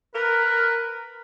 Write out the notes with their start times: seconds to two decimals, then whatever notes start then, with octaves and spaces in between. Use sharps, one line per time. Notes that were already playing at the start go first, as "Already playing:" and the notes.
0.15 A#4 B4